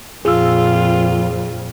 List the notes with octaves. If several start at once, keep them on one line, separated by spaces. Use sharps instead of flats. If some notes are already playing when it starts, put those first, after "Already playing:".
F2 A#2 F4 G#4 E6